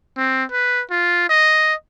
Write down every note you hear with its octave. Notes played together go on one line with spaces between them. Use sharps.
C4
B4
F4
D#5